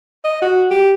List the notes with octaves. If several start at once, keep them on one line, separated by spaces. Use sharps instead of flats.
D#5
F#4
G4